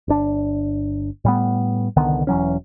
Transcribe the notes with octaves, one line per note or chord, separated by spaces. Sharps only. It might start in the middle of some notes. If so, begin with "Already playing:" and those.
G1 D4
A2 G3 B3
C2 D3 D#3 B3
E1 E3 F#3 C#4